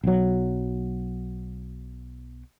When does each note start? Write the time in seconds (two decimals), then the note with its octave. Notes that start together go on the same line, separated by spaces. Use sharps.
0.04 B1 F#3